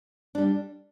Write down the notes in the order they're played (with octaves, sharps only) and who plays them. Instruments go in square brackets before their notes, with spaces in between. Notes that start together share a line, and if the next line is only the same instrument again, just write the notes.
[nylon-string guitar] G3 D4